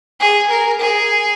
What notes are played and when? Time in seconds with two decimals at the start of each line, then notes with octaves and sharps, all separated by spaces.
0.20 G#4
0.50 A#4
0.80 G#4